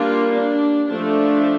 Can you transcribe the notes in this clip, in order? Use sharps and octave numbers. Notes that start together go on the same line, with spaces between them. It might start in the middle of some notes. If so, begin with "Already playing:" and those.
Already playing: G3 A#3 D4 F4
D4
F3 A3 D4